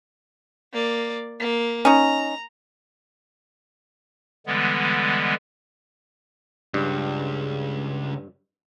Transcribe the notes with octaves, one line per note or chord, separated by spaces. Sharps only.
A#3 D5
A#3
C#4 D#4 A#5
D3 E3 G3 G#3 B3
C#2 G2